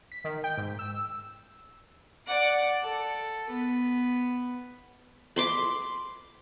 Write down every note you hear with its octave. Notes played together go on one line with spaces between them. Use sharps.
B6
D#3
G5
G#2
E6
D5 F#5
A4
B3
B5 C6 D6